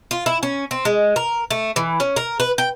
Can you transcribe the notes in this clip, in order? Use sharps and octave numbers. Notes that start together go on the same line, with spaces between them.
F4
E4
C#4
C4
G#3
A#4
A3
E3
C#4
A#4
B4
G5